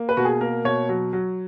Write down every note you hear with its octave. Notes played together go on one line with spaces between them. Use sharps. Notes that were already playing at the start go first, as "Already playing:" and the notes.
Already playing: A#3
B4
B2 F#4
G#4
A#3 A#4
B2 C#5
F#3
F#3